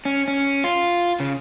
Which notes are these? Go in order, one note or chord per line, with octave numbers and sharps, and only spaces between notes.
C#4
C#4
F4
C#3